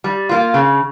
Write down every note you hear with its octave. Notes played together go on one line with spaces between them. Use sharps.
G3
A#3 F4
C#3